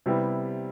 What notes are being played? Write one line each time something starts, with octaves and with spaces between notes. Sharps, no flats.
C3 G3 B3 E4